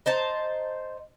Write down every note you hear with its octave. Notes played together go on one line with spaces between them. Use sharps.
D#4 C5 A5